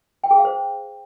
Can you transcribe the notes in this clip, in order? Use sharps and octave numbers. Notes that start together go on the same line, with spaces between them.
G5
G#4
F5
C5